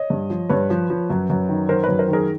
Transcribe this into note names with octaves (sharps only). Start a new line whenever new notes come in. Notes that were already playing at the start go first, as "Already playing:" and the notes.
Already playing: C#5 D#5
G2
F3
G2 B4 C#5
F3
F3
F#2
F#2
D#3
D#3 A#4 C5
F#2 B4 C#5
A#4 C5
D#3
G#4 A#4